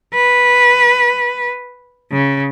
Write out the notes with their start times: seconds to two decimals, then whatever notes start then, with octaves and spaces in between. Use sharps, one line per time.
0.14 B4
2.12 C#3